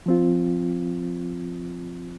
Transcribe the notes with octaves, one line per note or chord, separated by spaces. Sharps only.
F3 C4 F4